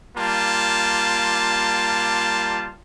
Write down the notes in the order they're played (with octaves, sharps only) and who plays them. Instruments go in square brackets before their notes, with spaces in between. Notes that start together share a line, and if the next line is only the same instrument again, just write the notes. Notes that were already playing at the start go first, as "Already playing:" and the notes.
[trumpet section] G3 A#3 F4 A5